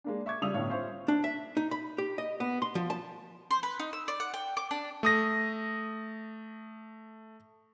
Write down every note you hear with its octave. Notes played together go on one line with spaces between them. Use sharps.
G#3 A#3 D4
E5 C#6 D6 G#6
C#3 G3 F4 D#6 E6 F7
G1 A2 C#5 F5
C#4 F4 C5 E5 C#6
D4
E5
D#4
B5
G4
D#5
B3
C6
F3
A5
C5
B4
D#4
E6
D5
F#5
G5
D6
D4
A3 D#6 A#6